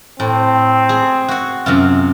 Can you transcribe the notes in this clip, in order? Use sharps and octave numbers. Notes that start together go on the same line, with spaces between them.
A2 C4
G#4
F#4 F#5
F#2 C3 F4